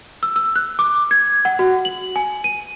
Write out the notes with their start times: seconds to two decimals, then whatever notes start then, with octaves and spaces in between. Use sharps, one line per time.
0.23 E6
0.36 E6
0.56 F#6
0.79 D6
1.11 G#6
1.45 F#5
1.59 F#4
1.85 F#7
2.16 G#5
2.44 D#7